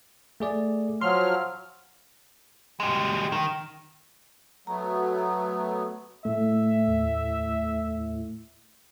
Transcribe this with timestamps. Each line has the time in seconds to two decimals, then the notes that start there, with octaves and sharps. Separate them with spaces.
0.40 A3 G#4 D5
1.01 F3 F#3 C6 F6
2.80 G3 G#3
3.32 D#3
4.67 F#3 A3 B3 A#5
6.25 A2 A3 E5
6.88 D#2